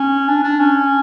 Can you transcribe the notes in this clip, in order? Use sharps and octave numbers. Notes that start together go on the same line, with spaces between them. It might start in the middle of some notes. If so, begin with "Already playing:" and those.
Already playing: C#4
D4
D4
C#4